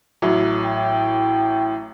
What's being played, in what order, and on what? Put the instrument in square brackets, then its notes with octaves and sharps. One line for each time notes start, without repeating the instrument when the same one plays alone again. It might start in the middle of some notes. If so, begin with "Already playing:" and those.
[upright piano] A1 A2 F#3
[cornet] G5